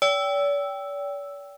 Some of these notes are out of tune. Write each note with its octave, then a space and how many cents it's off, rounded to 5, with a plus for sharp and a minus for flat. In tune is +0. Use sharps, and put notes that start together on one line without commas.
D5 -45 G5 +0 E6 +0